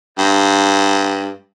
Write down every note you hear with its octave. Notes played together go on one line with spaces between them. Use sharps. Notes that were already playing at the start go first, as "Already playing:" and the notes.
G2